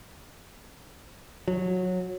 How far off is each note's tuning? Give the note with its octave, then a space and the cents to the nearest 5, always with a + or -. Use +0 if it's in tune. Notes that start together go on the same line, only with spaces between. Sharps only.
F#3 -20